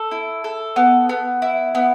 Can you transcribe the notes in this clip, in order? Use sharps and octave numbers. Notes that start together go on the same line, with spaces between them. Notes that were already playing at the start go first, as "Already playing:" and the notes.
Already playing: A4
E4
A4
B3
B3
E4
B3